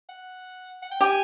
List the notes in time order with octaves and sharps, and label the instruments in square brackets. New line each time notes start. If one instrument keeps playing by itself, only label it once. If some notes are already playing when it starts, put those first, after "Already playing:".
[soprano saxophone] F#5
F#5
G5
[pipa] G4 [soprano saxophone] G#5